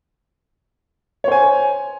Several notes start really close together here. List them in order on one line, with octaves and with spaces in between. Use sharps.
C#5 C5 G#5